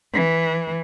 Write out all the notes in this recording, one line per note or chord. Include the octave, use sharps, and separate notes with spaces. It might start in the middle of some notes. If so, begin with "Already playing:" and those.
E3